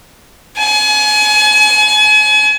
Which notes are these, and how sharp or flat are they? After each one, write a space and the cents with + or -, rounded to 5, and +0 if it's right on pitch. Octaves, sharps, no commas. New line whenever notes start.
G#5 +35